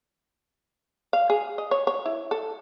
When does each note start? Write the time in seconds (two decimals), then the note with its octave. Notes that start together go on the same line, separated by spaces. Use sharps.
1.13 F5
1.30 G#4
1.58 D#5
1.71 C#5
1.87 C#5
2.06 E4
2.31 A4